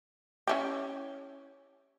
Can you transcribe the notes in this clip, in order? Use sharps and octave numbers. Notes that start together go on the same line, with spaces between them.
C#4 E4 G4